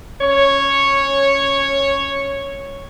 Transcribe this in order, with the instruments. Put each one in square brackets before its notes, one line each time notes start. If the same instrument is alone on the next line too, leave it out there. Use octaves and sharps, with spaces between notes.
[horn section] C#4 C#5